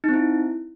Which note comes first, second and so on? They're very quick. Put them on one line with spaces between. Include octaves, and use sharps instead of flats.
D#4 C4 E4